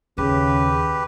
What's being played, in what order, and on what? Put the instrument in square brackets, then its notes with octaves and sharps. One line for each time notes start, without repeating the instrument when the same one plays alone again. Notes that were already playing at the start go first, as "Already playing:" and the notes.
[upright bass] D#2 [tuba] C#3 [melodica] G4 B4